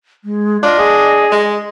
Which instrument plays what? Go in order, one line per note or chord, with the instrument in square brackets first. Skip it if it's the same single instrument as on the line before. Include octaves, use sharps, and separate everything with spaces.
[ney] G#3
[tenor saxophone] D4 [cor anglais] F4 [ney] D#5
[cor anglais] G#4
[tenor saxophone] G#3